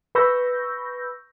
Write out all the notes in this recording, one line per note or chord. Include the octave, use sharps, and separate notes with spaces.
B4 B5 C#6 E6 G6 A#6